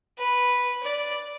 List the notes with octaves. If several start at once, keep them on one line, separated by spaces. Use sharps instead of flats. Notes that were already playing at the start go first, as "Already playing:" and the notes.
B4
D5